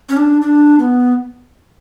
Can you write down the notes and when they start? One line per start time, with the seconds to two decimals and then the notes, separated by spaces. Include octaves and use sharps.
0.09 C#4
0.17 D4
0.42 D4
0.79 B3